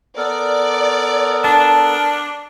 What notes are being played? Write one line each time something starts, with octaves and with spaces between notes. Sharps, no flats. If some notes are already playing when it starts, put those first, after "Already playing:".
B3 A4 A#4 D5
D4 A5